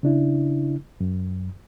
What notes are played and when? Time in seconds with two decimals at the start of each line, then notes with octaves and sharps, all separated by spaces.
0.03 C#3 D4 E4
1.00 F#2